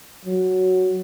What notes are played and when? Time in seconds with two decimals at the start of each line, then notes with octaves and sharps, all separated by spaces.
0.25 F#3